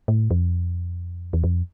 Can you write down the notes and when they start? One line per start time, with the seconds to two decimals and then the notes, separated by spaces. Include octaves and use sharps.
0.08 A2
0.31 F2
1.33 E2
1.44 F2